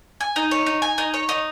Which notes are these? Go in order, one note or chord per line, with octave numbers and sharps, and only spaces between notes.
G#5
D#4
C#5
D#4
G#5
D#4
C#5
D#4